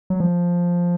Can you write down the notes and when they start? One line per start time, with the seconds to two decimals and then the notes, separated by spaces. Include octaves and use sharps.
0.10 F#3
0.20 F3